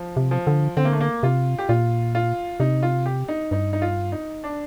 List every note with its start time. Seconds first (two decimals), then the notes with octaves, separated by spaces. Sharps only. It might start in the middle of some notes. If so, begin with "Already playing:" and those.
Already playing: F3
0.17 C3
0.31 F3
0.47 D3
0.77 D3 C4
0.85 A#3
0.93 A3
1.00 A#3
1.23 C3 F4
1.58 G4
1.69 A#2 F4
2.15 F4
2.60 C3 D#4
2.83 F4
3.06 G4
3.28 D#4
3.51 G2 D#4
3.73 D#4
3.82 F4
4.12 D#4
4.44 D4